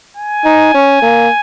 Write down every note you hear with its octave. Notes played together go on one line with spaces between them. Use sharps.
G#5
D#4
C#4
A#3